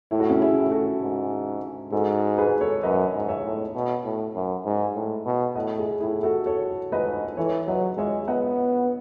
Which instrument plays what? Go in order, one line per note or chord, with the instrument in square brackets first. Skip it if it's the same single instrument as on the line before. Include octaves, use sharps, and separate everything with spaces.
[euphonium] A2 [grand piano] E4
[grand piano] F#4
C#4 E4
E4 G#4
[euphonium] A2
[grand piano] F#4 A4
[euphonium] G#2
[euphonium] G#2 [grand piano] F#4 A4
[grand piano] G#4 B4
A4 C#5
[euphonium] F#2 [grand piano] B4 D#5
[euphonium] G#2
[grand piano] C#5 E5
[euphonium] A2
B2
A2
F#2
G#2
A2
B2
[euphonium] A2 [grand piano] D#5 F#5
[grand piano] E4 G#4
[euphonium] A2 [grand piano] E4 G#4
[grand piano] F#4 A4
A4 C#5
[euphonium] G#2 [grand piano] B4 D#5
[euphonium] E3 [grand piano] A4 C#5
[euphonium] F#3 [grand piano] B4 D#5
[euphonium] G#3 [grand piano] C#5 E5
[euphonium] B3 [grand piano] D#5 F#5